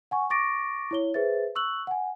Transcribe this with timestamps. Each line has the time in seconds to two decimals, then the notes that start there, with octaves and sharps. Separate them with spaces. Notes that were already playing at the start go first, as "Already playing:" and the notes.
0.11 F#5 G#5 C#6
0.30 C#6 D6 A6 A#6 D7
0.91 E4 C#5 G7
1.14 G#4 B4 C5 E5 A6
1.55 C#6 E6 F#6 F#7
1.87 F#5 G#5